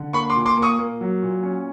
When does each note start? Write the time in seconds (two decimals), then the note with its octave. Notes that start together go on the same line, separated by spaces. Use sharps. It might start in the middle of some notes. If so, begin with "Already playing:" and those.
Already playing: D3
0.13 A#3 B5 C#6
0.30 C6 D6
0.35 A#2
0.46 C6 D6
0.57 A#3
0.62 C#6 D#6
0.79 A#3
1.01 F#3
1.22 A#2
1.43 C#4